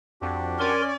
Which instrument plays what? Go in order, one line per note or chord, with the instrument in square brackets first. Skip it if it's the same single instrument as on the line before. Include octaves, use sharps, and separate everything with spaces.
[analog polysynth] F2 [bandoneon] D4 F#4 G4
[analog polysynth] C#4 G#5 [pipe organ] A#4 C6 [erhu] D5